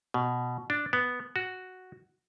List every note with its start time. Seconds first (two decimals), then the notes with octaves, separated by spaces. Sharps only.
0.14 B2
0.70 D4
0.93 B3
1.36 F#4